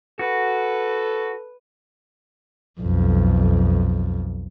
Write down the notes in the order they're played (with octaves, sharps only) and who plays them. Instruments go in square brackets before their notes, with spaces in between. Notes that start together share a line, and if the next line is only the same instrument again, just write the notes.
[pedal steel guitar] F#4 [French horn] A4 [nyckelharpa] B4
[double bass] B1 F2